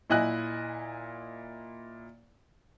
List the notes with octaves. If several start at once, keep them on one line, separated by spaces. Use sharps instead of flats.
A#2 E4 D#5 G#5 F#6